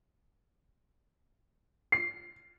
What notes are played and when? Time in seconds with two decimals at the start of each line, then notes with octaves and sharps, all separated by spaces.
1.92 C7